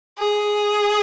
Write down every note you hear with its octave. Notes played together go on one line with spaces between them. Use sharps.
G#4